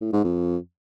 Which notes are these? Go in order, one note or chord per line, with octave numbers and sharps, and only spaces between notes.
A2
G#2
F2